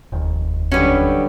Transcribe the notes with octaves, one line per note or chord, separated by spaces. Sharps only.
F1 D#2
D3 F#3 G3 C#4 B4